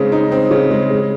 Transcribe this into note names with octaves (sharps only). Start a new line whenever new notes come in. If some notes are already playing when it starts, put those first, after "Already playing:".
Already playing: C#3 G#3 C4 D#4
D#4
C4
C#3
G#3
G#3